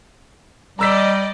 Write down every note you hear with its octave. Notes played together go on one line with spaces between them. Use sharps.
G3 D5 D#5 A#5 E6 B6